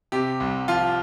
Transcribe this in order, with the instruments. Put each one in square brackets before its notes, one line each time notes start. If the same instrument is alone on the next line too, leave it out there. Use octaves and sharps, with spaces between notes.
[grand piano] C3 G4
C2
F3 F4